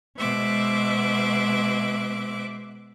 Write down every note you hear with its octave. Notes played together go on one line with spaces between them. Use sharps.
B2 G#3 C5 E5 D6 F#6